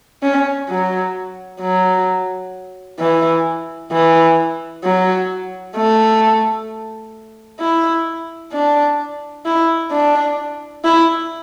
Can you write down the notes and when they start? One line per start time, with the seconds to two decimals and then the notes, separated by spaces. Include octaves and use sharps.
0.23 C#4
0.69 F#3
1.61 F#3
3.00 E3
3.92 E3
4.84 F#3
5.76 A3
7.60 E4
8.53 D4
9.45 E4
9.91 D4
10.84 E4